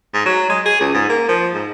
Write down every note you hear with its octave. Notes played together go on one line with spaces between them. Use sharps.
G#2
F#3
G#3
G#4
C#2
G#2
A#3
F3
G#2